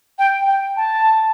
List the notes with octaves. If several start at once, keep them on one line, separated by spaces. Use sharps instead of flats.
G5
G5
A5